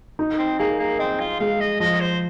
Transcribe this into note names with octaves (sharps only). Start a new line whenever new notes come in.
D#4
C4
A#3 G#4
A#3
C4 D#5
F4
G#3 F5
D#5
F3 D#5
C5